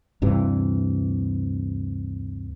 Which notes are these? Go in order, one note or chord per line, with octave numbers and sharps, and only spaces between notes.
D2 G2 C3 E3